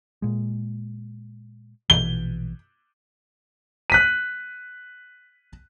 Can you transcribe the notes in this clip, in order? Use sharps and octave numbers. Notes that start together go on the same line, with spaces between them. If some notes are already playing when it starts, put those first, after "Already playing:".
A#2 G#3
A#1 B2 E3 G7
F#6 B6 D#7